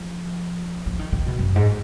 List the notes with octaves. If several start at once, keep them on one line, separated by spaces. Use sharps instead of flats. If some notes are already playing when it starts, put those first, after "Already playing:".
Already playing: F3
F3
D#3
D#3
B2
F#2
G#2